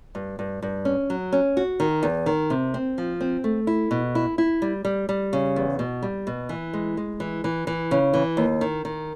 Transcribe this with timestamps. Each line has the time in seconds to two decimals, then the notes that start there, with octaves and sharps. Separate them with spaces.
0.15 G2
0.39 G2
0.62 G2
0.85 C#4
1.10 F#3
1.32 C#4
1.57 F#4
1.80 D#3
2.03 E2
2.26 D#3
2.50 C3
2.74 C4
2.98 F3
3.21 C4
3.44 A3
3.67 E4
3.91 B2
4.15 E4
4.38 E4
4.62 G3
4.85 G3
5.09 G3
5.33 C#3
5.56 E2
5.79 B2
6.02 G3
6.27 B2
6.49 E3
6.73 G#3
6.97 G#3
7.20 E3
7.44 E3
7.67 E3
7.91 C#3
8.14 E3
8.37 D#2
8.61 D#3
8.85 D#3